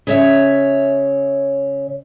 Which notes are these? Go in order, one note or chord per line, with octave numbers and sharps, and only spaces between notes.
C#3 C#5 E5